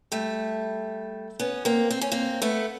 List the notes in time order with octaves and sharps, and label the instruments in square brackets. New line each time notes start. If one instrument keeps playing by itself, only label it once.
[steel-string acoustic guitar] G3 A3
B3 C#4
A#3 C4
C4
C#4
A#3 C4
A3 B3